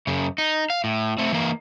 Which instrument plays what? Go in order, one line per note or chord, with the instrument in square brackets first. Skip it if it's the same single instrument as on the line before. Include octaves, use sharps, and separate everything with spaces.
[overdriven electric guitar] F#2 C#3
D#4
F5
A2
A3 C4
E3 A#3